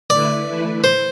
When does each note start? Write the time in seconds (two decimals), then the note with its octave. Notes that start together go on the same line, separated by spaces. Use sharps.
0.10 D3 A3 E4 B4 D5
0.47 E3 A3 E4 B4
0.84 C5